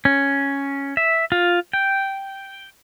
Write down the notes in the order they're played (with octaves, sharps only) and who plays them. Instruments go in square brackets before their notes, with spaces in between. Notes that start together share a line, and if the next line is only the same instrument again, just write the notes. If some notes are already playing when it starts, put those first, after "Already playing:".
[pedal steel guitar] C#4
E5
F4
G5